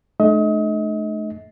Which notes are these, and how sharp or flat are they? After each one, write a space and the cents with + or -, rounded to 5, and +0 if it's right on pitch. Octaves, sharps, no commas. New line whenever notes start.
A3 -35 D4 +45 D#5 +35